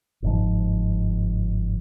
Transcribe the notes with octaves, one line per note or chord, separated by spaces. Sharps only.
G1 G#2 F3